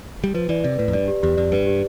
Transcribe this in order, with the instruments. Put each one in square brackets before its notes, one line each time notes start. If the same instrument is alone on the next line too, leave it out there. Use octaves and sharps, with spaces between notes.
[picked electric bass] G3
[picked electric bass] F3 [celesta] B4
[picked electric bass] E3 [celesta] D5
[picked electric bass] C3 [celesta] D5
[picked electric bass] A2 [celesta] B4
[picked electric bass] F2
[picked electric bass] G2 [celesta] D5
[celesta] G4
[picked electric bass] E2 [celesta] G4
[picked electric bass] F2 [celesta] D5
[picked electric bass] G2 [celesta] B4
[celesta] G4